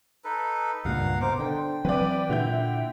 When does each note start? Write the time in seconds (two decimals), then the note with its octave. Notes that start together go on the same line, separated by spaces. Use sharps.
0.24 D#4 A4 B4
0.85 C#2 G2 A#2 A#4 F5 F#5
1.21 B2 D#4 A#4 C5 D6
1.39 D3 G5
1.85 E3 F#3 C4 B4 D5
2.29 A#2 D3 E4 G6